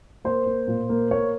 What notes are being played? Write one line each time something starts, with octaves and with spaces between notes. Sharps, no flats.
A#3 C5
A#3
A#2
A#3
A#3 C#5